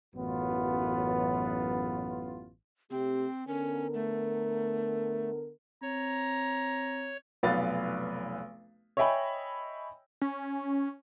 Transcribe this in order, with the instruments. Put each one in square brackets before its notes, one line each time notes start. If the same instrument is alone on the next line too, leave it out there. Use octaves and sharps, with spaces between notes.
[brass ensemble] A1 F#2 B3 F4
[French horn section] C3 A3 G4 [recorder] C4
[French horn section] D3 B3 A#4 [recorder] C#4
[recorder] A3
[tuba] C4 [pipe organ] C#5 [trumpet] A#5
[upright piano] F1 B1 B3 B4 F5 A6
C#5 D#5 E5 G5 G#5 B5
[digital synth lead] C#4